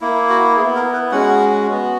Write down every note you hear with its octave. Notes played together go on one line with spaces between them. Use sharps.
A#3 E4
F#4
B3 E4 G#4
A#4
B4
G#3 C#4 F#4 F#5
B3 F#4